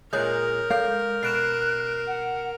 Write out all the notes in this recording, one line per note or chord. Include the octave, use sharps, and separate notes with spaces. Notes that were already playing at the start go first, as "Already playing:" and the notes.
A#2 G#3 A#4 C#5 D#6 G6
G#3 A4 F5 G6
B2 F#6 C7 D7 E7
F#5